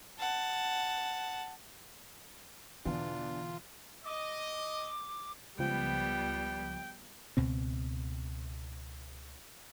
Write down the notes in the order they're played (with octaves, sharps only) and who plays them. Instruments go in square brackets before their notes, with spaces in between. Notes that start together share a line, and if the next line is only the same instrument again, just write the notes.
[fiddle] F#5 A5
[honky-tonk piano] E2 [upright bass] B2 D3 [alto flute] D4 [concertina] F4
[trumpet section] D#5 [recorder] D6
[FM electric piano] C#2 F3 [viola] G3 B3 [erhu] G5
[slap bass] C#2 B2 C4